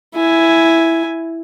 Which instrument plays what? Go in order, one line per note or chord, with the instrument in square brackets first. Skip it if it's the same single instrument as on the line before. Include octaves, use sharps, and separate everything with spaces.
[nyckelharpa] E4 G#5